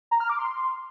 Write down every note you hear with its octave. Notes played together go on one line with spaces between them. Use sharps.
A#5
F6
D6
C6